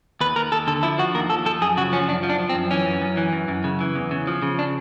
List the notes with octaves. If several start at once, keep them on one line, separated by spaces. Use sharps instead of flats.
D#2 B4
D#2 A#4
D#2 A4
D3 A4
F3 E4
F3 F#4
D#2 A#4
D#2 A4
F3 A4
F#2 G#4
C#3 F#4
F3 C#4
F#2 D4
F3
D4
F3
C4
F#2
E3 C#4
F#2
F#2
E3
F#2
F#2
C#3
E3
E2
C#3
F3
C#3
D4